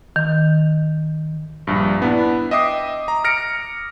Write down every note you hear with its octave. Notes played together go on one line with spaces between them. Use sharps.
D#3
A#1 G2
B3 D4 E4
D#5 E5 G5 D6 D#6 C7
A#5
F6 A#6 C#7 D7